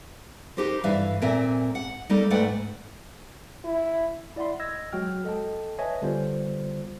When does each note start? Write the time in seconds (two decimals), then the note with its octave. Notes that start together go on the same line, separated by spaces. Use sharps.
0.57 D#4 F#4 G4 A#4 C5
0.84 G2 E3 B4 E5 F5
1.22 A#2 A#3 C4 A#4 E5 G#5
1.75 F#5
2.09 G3 A#3 D#4 A4
2.30 G#2 A3 B4 D5 F#5 G5
3.65 E4
4.36 E4 D5 E5 F#5 B5 C6
4.60 D#5 E6 G#6 A#6
4.92 F#3 G#3 F#4 G5 F6
5.24 A4 D#5 G5 A5
5.78 B4 C#5 D#5 E5 G#5 A5
6.02 D3 G3 B3 F4 C5